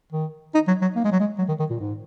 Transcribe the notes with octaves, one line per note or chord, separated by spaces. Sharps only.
D#3
D#4
F#3
F#3
A#3
G#3
F#3
G#3
F#3
D#3
D#3
A#2
G#2